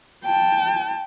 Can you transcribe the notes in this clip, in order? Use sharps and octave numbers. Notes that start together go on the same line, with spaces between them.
G5 A5